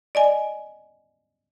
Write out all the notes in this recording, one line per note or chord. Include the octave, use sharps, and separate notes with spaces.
D5 D#5 G#5